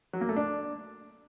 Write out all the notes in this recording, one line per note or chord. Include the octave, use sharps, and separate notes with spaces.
F#3
A#3
A3
D4